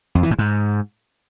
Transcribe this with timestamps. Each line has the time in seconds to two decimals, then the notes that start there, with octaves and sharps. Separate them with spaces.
0.15 F2
0.23 E3
0.31 A2
0.39 G#2